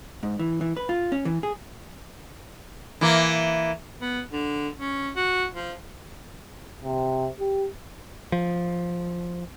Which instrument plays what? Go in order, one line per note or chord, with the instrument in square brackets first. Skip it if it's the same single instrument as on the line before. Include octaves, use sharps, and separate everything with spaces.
[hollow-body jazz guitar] G#2
E3
E3
B4
F4
C#4
E3
G#4
[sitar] E3 A#3
[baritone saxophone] B3
D3
C#4
F#4
F3
[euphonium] C3
G4
[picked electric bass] F3